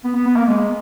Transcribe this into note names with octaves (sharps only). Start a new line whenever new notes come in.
B3
B3
B3
A#3
G#3